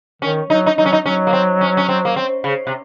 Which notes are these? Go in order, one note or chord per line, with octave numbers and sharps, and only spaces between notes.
D#3 C#4
F#3 D#4
D#4
F#3 D#4
C#4
D#4
F#3 C#4
A#3
C4
C#4
C#4
C4
A#3
C4
C#3
C3